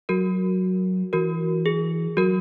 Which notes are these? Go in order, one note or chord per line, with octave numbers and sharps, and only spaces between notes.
F#3 F#4 A#4
E3 F#4 A#4
G#4
F#3 F#4 A#4